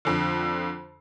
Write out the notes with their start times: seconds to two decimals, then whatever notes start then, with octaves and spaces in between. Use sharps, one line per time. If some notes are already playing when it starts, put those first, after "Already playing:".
0.05 F2 D3